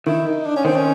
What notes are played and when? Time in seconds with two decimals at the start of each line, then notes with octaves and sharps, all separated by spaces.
0.07 D#3 E4
0.26 D#4
0.46 D4
0.56 C#4
0.65 D#3 C4
0.77 C#4